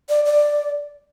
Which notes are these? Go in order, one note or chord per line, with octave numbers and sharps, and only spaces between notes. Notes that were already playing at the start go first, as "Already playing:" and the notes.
D5
D5